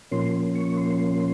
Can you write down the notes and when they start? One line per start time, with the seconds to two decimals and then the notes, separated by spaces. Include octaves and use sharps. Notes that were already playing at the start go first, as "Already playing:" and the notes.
0.11 A#2 F3 A#3 C#4 C6
0.55 C#6
0.77 C6